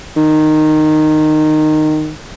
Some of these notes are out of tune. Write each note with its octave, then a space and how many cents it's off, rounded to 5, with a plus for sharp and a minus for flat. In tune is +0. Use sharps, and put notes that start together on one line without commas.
D#3 -15